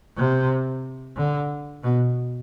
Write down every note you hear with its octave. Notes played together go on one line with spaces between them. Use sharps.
C3
D3
B2